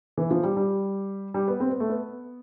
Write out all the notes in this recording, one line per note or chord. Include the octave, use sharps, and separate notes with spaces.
E3
F3
G3
G3
G3
B3
C4
B3
A3
B3